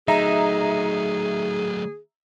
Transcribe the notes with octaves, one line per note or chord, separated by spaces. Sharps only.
F#3 A3 D#4 G#4 E5 A#5